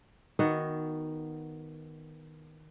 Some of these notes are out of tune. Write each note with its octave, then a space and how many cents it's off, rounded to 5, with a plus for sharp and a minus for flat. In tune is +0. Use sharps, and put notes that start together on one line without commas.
D#3 +0 B3 +0 F#4 +0